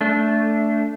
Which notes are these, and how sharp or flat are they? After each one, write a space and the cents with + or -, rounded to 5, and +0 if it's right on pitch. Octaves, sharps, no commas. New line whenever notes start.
A3 +5 D4 -15